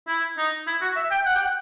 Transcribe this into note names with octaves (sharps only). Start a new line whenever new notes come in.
E4
D#4
E4
F#4
E5
G5
F#5
G5
F#5